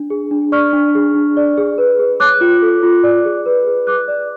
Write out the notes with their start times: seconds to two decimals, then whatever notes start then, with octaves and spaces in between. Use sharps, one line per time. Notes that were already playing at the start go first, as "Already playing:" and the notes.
Already playing: D4
0.10 G#4
0.31 D4
0.52 D5 C#6 F6
0.73 D4
0.95 G#4
1.15 D4
1.37 D5
1.57 G#4
1.78 B4
1.99 G#4
2.20 C#5 D6 F#6
2.41 F4
2.62 A4
2.83 F4
3.03 D5
3.25 G#4
3.46 B4
3.67 G#4
3.87 G#4 D6 F#6
4.08 D5